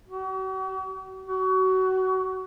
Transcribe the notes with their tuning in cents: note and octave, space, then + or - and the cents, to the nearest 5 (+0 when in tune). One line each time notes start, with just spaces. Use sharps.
F#4 +45
F#4 +25